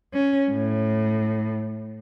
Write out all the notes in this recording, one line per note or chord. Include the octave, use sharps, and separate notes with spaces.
C#4
A2